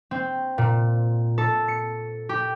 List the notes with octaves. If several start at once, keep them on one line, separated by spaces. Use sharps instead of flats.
C4
A#2
A4
C#7
G4